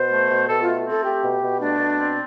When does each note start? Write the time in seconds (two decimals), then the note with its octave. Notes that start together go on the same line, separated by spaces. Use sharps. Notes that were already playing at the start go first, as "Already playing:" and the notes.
Already playing: B2 C5
0.10 A3
0.29 B2
0.48 B2 A4
0.62 A3 F4
0.86 C4 A4
1.04 A3 G4
1.23 B2
1.42 B2
1.60 A3 D4
1.79 B2
1.98 C4